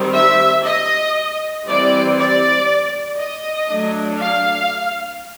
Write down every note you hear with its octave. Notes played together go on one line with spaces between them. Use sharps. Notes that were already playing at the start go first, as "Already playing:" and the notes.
Already playing: D#3 G3 C4
E5
D#5
E3 G3 C4 D5
D5
D#5
F#3 A3 D4
F5